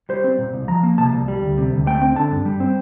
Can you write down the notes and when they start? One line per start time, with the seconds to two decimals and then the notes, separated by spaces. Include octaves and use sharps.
0.09 G3 C5
0.24 C4
0.38 A#2
0.53 C2
0.68 F3 A#5
0.83 A#3
0.98 C3 A5
1.13 C2
1.28 G3
1.42 D2
1.58 C3
1.72 D2
1.87 A3 G5
2.01 C4
2.15 D3 A5
2.31 G2
2.45 G3
2.60 C4